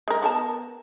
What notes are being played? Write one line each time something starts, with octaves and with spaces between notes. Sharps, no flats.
G#3 A#4
B3 A#4 A5